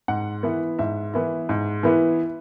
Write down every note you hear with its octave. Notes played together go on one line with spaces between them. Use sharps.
G#2 F#5
E3 B3 E4
G#2 E5
E3 B3 E4
G#2
E3 B3 E4